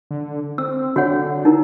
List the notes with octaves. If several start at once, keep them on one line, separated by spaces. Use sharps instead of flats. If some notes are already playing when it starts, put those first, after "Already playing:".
D3
C4 E6
D3 F#4 C#5 F#5
D#4 E4 A#4